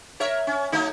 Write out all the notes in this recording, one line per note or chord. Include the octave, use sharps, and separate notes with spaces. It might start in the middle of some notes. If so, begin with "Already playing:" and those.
A#4 C#5 E5
C#4
F#3 A3 D#4